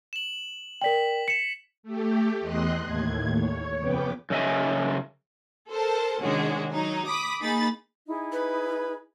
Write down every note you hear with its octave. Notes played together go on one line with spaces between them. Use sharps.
E7 F#7
A#4 D5 G5 B6 F#7
B6 C#7 E7
A3 G4
E2 D#5 C6 F#6
D#2 A2 G#6
C#5
F2 C#3 B3 B4 G5 D6
F#2 C#3 D#5 E5 G#5
A4 A#4 C5 A5
C3 D#3 G#3 C#4 D4 F#4
F#3 D#4
B5 D6 D#6 B6
A#3 D#4 G#4 B5 A6
D#4 E4 G#4
B4